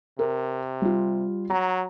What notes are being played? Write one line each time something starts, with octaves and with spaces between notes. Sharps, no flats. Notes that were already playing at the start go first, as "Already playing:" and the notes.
C3 A#4
G3 F4
F#3 A#5